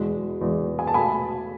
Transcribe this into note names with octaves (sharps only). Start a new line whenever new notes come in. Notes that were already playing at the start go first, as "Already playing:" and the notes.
Already playing: E2 B2 G#3
E2 B2 G#3
G#5
A5
B2 A3 G#5 B5